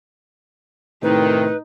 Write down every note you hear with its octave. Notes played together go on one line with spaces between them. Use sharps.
A2 C3 D#3 D#4 B4